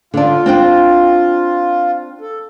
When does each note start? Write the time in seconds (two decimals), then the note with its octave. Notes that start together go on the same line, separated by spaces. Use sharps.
0.14 D3 D4 F4
0.46 C4 D4 G5
2.21 A4